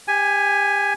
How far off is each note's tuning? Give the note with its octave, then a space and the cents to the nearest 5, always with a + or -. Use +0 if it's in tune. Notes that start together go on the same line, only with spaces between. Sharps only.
G4 +25 G#5 +0